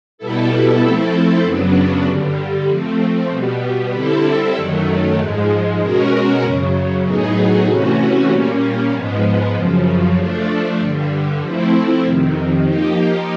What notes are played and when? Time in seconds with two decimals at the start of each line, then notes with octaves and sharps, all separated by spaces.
0.18 B2 G3 B3 E4 A4
0.80 F3 A3 C4 E4 A4
1.43 F#2 C#3 F#3 B3 D4
2.06 G2 D3 G3
2.68 F3 A3 C4
3.30 B2 G3 B3
3.92 D3 G3 C4 E4 A4
4.54 F#2 D#3 F#3 A3
5.17 G#2 F3 G#3
5.80 B2 G#3 C#4 F#4 A#4
6.41 F#2 C#3 F#3
7.04 A2 F#3 B3 D#4 G#4
7.66 C3 E3 A3 C#4 F#4
8.29 A#2 G3 A#3 C#4
8.91 G#2 F3 G#3 B3
9.53 F#2 C#3 F3
10.16 F3 A3 D4
10.78 G2 D3 G3
11.40 F3 A3 C4 E4
12.03 F2 C3 D#3
12.66 F3 A#3 D#4 G4